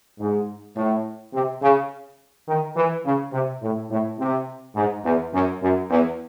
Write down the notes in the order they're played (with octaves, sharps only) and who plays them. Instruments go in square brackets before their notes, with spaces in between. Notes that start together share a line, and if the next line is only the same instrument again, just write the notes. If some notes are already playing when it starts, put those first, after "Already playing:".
[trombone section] G#2
A2
C3
C#3
D#3
E3
C#3
C3
A2
A2
C3
G#2
E2
F#2
F#2
E2